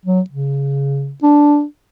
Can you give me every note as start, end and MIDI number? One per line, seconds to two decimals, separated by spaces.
0.05 0.21 54
0.30 1.13 49
1.23 1.64 62